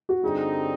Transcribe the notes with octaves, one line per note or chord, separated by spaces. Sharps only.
F#4
G2 D3 G3 C4 D#4 G#4